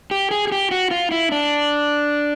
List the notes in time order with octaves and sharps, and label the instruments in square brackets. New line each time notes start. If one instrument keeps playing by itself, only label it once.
[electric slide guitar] G4
G#4
G#4
G4
F#4
F4
E4
D4